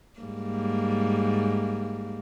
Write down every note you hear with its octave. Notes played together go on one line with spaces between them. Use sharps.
G#2 G3 A#3